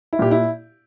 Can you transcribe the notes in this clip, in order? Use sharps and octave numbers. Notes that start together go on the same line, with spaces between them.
E4
A#2 G4
E4